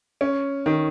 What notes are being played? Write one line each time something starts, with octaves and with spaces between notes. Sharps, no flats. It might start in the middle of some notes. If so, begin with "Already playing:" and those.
C#4
D#3